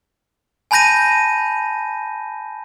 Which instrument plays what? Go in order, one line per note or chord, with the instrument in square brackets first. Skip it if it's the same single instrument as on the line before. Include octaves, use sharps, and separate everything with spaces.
[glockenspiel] G#5 A5 B5 G6 A#6 D#7